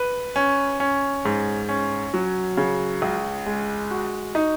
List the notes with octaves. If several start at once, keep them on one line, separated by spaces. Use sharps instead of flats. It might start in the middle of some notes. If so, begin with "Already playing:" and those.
Already playing: B4
C#4
C#4
G#2
C#4
F#3
C#3
C#2
G#3
F#4
D#4